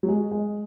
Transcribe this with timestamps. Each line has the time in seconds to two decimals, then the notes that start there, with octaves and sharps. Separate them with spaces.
0.03 F#3
0.08 G#3
0.31 G#3